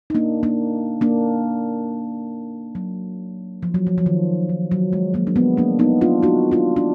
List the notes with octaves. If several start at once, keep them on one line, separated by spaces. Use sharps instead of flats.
D#4
A#3 D4
A#3 D4
A#3 D4
F#3
F3
F#3
F3
F3
D#3
D#3
F#3
G#3
F#3 A#3
D4
G#3 B3
A#3 D4
B3 D#4
D4 F4
D#4 F#4
D4 F4
D4